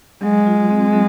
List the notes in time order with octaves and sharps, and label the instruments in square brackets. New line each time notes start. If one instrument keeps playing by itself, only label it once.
[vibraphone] F#3 [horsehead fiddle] G#3
[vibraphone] F4
C4
F#3